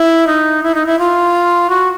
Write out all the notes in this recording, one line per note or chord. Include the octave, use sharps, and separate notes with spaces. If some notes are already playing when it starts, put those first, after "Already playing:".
Already playing: E4
D#4
E4
D#4
E4
F4
F#4